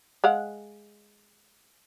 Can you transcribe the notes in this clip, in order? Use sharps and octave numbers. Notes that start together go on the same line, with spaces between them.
G#3 F5 F#5